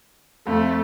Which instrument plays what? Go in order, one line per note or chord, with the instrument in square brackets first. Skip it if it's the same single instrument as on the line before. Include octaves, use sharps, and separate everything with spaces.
[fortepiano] F2 [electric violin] A3